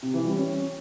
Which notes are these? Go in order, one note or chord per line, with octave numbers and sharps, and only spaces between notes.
C3
E3
G3
C#4